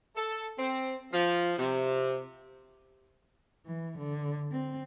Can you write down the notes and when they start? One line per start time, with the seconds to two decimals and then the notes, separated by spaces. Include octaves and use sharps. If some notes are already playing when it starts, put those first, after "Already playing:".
0.16 A4
0.58 C4
1.13 F3
1.58 C3
3.66 E3
3.99 D3
4.52 C4